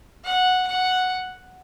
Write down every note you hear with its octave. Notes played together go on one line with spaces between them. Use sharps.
F#5
F#5